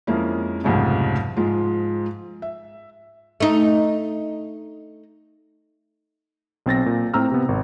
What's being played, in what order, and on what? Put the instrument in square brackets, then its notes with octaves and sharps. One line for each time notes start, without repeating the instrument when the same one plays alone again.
[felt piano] F2 G#3 A#3 C#4 E4
C2 F2 G#2 C#3 G3 A3
G#2 F3 G#3 F4
E5
[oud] A3 D#4
[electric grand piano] B1 C4 A6 A#6
A#2
A2 C4 A#5 E6 F6
C3 B3
G#1